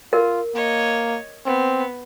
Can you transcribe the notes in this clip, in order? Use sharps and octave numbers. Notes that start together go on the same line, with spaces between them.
F4 A#4
A#3 C#5 D#5
B3 C4